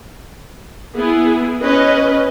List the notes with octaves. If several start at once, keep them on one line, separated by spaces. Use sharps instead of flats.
B3 E4 G#4
C#4 B4 D#5